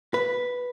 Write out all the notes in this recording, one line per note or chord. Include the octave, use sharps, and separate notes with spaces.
B4